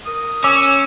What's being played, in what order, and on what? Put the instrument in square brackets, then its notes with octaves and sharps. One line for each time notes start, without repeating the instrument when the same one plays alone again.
[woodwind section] A#4 D#6
[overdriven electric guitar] C#4 [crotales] D6 [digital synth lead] E6